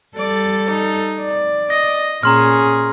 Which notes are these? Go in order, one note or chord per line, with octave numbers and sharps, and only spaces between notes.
G3 A4 D5
D#4
D5
D#5 A#6
A#2 C#4 G#4 A#5 C6 F6